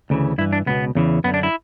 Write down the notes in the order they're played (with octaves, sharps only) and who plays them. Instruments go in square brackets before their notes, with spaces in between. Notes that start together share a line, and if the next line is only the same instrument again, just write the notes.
[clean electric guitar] D2 C#3 E3
G2 E4
E3
D4
C#2 B2 B3
E2 C#3 E3
F#2 B3
D3
D4
E4